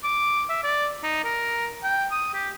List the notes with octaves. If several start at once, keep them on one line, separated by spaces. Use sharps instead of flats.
D6
E5
D5
D#4
A#4
G5
D#6
G4